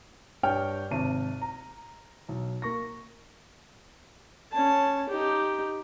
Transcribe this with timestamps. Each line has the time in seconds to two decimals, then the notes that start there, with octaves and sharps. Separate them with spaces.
0.43 G2 G4 C#5 G5 F6
0.91 G#1 C3 A5 D#7
1.41 A#5
2.29 B1
2.62 A#3 C#6 A#6
4.52 C#4 A5
5.09 D#4 G4